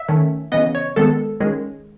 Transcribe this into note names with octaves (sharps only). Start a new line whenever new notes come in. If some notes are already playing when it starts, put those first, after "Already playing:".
Already playing: E5
D#3 A3 C#4
C#3 E3 B3 D#5
C#5
D#3 G#3 B3 A4
D#3 G#3 C#4